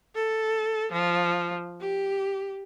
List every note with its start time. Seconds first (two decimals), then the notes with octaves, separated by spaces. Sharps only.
0.15 A4
0.92 F3
1.81 G4